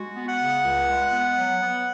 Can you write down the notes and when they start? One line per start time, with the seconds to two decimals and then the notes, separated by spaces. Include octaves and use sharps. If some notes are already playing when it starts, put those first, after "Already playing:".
Already playing: G#3 F#4
0.15 B3
0.27 F#5
0.39 C#3
0.63 C#2
0.88 G#3
1.12 B3
1.36 F#3
1.60 B3